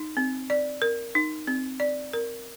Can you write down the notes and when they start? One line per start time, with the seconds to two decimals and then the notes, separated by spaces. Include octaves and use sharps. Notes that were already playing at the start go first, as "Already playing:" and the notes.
Already playing: D#4
0.17 C4
0.50 D5
0.82 A#4
1.15 D#4
1.47 C4
1.80 D5
2.13 A#4